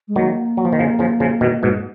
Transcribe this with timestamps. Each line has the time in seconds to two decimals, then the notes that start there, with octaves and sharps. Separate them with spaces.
0.08 G#3
0.16 D#3 F#3 A#3
0.57 F#3
0.65 F3
0.73 D#3
0.79 C#3 F3
0.99 C#3 F3
1.20 C#3 F3
1.41 B2 D#3
1.63 G#2 B2